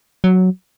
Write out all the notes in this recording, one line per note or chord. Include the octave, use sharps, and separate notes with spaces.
F#3